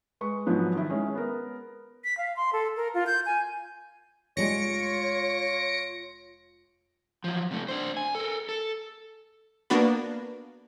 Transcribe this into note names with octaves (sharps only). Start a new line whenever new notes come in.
G#3 B4 C#6
G#2 F3 F#3 B3
D#3 E4
G#3 C#4
B3 A#4
B6
F5
C6
A4
A#4
F4
G6
G#5
F1 G3 G#3 F4 C#5 A#6 C#7 D7
F3 F#3
C3 A3
D4 C5
G#5
A4 A#4
A4
A#3 B3 D4 F#4 B4